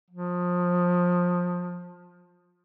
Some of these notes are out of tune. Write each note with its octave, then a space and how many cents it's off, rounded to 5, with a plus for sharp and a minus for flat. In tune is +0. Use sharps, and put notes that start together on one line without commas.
F3 +25